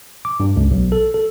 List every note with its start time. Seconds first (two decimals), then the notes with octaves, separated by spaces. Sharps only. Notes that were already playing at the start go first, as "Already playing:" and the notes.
0.25 D6
0.40 G2
0.56 C#2
0.71 B1
0.92 A4
1.14 A4